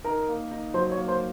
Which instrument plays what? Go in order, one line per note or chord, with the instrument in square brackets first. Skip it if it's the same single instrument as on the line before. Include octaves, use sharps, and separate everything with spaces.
[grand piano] D#4 [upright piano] A#4
[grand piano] A#3
D#4
[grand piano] F#3 [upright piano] C5
[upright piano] C#5
[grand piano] A#3
[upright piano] C5